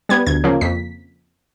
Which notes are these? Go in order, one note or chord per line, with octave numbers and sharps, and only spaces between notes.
G3 B3 G#6
D2 G#6
C#3 F3 A#3
F2 B6